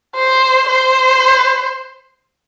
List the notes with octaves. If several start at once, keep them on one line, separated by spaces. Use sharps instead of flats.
C5
C5